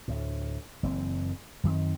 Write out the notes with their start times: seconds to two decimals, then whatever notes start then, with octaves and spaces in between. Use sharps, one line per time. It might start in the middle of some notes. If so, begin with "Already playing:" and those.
0.08 D2 A2
0.83 F#1 E3 C4
1.64 F#2 D#3 C4